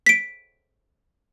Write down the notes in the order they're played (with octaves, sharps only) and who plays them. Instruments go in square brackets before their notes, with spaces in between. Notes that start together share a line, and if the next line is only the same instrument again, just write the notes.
[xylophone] B6 D7